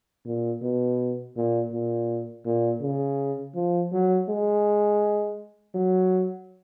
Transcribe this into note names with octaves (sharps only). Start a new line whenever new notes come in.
A#2
B2
A#2
A#2
A#2
C#3
F3
F#3
G#3
F#3